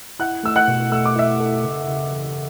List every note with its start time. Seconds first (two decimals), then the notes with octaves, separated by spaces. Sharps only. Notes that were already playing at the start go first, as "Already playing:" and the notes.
0.19 E4 F#5 F#6
0.43 A3 E6
0.56 F#5 F#6
0.68 B2
0.92 A3 E6
1.06 D6
1.16 E4 E5 E6
1.40 A4
1.64 C#3
1.88 C#3
2.11 E3